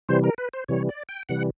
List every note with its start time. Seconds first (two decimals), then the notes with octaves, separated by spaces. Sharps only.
0.09 C3 E3 G3 C5
0.24 A#4
0.38 B4
0.53 C5
0.68 C3 E3 G3 C#5
0.89 D5
1.09 G5
1.29 C3 E3 G3 F#5